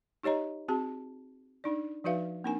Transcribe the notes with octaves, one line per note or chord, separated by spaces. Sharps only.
D#4 G4 C#5 D#5 A#5
C4 F#4 G#4 A5
D4 D#4 D5
F3 D#4 F#4 B4 E5 F5
A#3 C4 D4 D#4 A#4 G#5